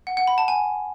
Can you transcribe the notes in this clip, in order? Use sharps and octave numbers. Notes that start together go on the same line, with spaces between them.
F#5
F#5
B5
A5
G#5